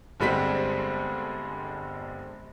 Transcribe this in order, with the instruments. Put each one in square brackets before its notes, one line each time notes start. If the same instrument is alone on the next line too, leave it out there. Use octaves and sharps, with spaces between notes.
[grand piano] G1 D3 G3 G#3 C4 B6